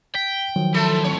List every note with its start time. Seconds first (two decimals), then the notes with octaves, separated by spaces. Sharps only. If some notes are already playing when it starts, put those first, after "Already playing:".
0.15 G5 B6
0.56 D#3 F3 F#3
0.74 A3 E4 A4 C5
1.04 F2 A2 C#5